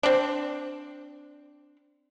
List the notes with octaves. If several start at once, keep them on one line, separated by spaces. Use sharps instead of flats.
C4 D4